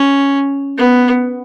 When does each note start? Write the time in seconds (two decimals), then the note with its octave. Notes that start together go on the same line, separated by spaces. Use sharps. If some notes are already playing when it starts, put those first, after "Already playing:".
Already playing: C#4
0.78 B3